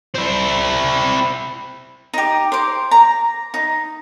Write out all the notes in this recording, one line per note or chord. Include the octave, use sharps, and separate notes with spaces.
C4 E4
D#4 G4
C5 D6
A#5
D#4